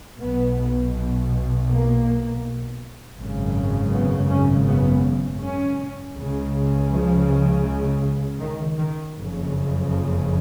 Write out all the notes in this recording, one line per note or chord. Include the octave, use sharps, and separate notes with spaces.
B1 B2 B3
A#3
G#1 F#2 C#3
B3
C#4
B3
C#4
C#2 C#3
F3
D#3
D#3
F#1 F2 C#3
F3